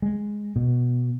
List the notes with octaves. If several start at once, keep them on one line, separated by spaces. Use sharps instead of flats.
G#3
B2